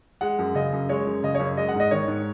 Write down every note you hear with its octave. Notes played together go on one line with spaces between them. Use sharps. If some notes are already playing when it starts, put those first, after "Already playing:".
G#3 F#5
F#2
C#3 D#5
F#2
G#3 C#5
F#2
C#3 D#5
C#5
F#2
G#3 D#5
F#5
G#2 D#5
D#3 C#5
G#2